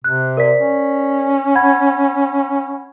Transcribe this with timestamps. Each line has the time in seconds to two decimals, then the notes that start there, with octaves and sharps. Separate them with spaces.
0.04 C3 F#6
0.37 A#4 D5 B6
0.60 C#4
1.55 F#5 B5 G#6